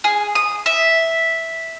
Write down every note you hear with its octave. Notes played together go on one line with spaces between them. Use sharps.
G#4
D#6
E5